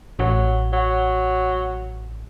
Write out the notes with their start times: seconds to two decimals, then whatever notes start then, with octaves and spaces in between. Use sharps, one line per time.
0.19 A1 F#3
0.73 F#3